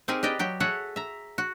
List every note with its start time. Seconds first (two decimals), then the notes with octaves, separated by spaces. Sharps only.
0.08 C4 D#4 G4 G#4 A#4 G#5
0.23 G4 B4 D5 D#5 G5
0.39 F#3 G4 G5
0.60 F#4 G#4 A4 C#5 E5 F#5
0.96 E5 A#5
1.38 F#4